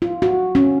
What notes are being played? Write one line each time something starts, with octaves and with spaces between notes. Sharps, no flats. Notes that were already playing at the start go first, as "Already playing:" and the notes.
F4
F#4
C#4